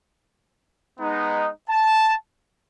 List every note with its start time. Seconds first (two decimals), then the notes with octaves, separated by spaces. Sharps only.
0.98 G#3 B3 D#4
1.70 A5